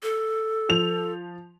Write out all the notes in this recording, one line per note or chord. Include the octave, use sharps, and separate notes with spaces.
A4
F3 F7